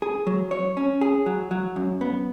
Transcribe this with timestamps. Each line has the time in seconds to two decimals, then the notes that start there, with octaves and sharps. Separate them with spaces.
0.02 G#4
0.27 F#3
0.51 C#5
0.77 C#4
1.01 G#4
1.26 F#3
1.51 F#3
1.76 F#2
2.01 B3